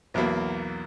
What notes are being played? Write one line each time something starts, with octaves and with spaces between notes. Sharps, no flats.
B1 E2 F#3 A#3 B5